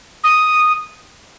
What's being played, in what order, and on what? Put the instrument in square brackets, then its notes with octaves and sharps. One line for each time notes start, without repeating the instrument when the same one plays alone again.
[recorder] D#6